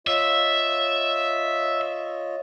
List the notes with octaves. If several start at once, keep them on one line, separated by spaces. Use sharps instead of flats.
F4 C#5 D#5 E5